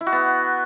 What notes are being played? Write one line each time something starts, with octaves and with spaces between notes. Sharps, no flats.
E4
F#4
B3